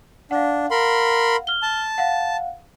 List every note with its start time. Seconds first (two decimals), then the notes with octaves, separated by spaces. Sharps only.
0.31 D4 F5 F#5
0.71 A#4 B5 C6
1.47 F6 G7
1.62 A5
1.98 F5 F#5